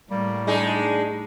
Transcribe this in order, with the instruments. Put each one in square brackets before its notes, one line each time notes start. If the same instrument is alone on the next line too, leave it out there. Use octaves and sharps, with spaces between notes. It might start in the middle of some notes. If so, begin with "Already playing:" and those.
[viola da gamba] A2 [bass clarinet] G3 [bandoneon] A#3
[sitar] G#3 D#4 G#4 [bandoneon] D4